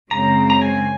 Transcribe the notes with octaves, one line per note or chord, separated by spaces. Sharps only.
F#2 C#3 G#3 C4 A#5
A#5
G#5